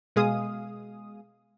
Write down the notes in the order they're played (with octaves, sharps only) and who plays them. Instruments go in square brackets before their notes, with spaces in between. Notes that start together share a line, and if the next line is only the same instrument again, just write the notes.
[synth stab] B2 G#3 G#4 F5 D#6